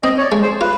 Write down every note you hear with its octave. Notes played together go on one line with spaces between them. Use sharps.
C4 D#5
C#5
D5
G#3
C5
F4 B4